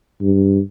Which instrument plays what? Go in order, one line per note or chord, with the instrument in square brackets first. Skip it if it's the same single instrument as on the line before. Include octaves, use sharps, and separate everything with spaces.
[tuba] G2